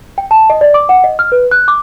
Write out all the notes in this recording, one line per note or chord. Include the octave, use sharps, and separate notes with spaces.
G5
A5
D#5
D5
D6
F#5
D#5
F6
B4
F#6
D6